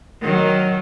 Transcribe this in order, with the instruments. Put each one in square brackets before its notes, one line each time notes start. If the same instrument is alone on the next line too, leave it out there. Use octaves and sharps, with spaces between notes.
[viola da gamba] D#3 F#3